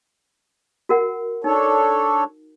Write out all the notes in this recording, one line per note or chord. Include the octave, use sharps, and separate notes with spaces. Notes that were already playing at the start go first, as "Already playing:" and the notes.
F#4 A#4 F#5
D4 D#4 A4 C#5